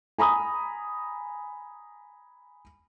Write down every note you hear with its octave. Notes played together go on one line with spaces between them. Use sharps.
G#5 A#5 B5 D#6